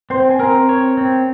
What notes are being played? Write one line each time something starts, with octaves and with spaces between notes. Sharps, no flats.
C4 C5 C6
G#5
C4 A#4 A#5
C#5
C4